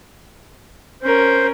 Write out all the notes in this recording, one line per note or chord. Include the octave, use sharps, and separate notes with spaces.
C#4 A#4 C5